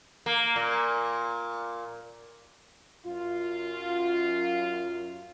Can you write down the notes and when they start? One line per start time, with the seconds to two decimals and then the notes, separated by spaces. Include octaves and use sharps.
0.26 A#3
0.56 A#2
3.06 F#2 F4